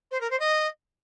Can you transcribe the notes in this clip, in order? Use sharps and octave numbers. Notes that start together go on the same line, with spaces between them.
C5
A#4
C5
D#5